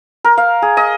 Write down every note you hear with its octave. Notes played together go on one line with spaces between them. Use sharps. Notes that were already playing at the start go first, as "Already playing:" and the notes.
A#4
F5
G#4
D#5